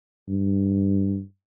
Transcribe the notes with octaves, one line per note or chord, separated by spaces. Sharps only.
G2